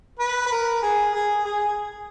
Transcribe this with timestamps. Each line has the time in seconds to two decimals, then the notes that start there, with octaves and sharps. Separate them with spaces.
0.20 B4
0.47 B4
0.51 A#4
0.82 G#4
1.14 G#4
1.45 G#4